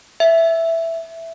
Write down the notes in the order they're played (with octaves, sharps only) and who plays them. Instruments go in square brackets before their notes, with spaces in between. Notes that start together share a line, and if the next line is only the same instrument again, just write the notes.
[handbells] E5